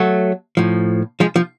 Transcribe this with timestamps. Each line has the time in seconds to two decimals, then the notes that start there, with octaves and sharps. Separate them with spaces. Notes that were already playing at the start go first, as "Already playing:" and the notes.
Already playing: F#3 A3
0.57 A2 F3
1.20 F3 G#3
1.36 F3